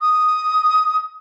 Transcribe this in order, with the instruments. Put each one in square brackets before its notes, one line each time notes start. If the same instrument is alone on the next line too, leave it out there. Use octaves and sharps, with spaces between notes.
[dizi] D#6